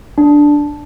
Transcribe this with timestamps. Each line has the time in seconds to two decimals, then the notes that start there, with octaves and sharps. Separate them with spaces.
0.18 D4